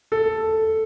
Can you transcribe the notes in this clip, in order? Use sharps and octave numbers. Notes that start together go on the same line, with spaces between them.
A4